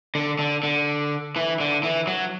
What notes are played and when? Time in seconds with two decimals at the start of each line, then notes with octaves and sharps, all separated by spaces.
0.15 D3
0.39 D3
0.63 D3
1.36 E3
1.60 D3
1.83 E3
2.07 F#3